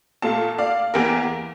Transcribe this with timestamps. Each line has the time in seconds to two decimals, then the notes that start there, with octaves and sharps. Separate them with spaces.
0.22 A#2 A3 F5 A5
0.59 D5 F5
0.94 E2 E3 A#3 G4 A#4